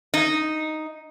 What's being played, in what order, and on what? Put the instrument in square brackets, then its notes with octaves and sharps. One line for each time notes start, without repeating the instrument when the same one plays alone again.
[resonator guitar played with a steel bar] D#4